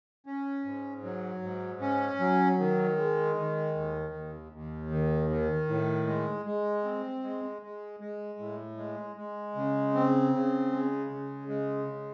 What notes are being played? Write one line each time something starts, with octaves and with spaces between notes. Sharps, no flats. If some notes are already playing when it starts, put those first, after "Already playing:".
C#4
G#2
F#3
G#2
C#4
F#3
D#3
G#3
D#3
D#2
D#2
D#2
D#3
D#3
A2
G#3
G#3
C4
G#3
G#3
G#3
A2
G#3
G#3
C#3
C4
C#3
G#3
C#3
G#3
C#3